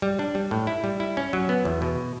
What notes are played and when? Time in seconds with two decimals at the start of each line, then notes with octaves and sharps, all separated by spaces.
0.02 G3
0.19 D4
0.35 G3
0.51 A2
0.67 E4
0.84 G3
1.00 E4
1.17 C#4
1.33 F#3
1.49 B3
1.65 E2
1.82 B2